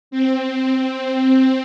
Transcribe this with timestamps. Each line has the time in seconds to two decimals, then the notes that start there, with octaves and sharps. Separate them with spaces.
0.11 C4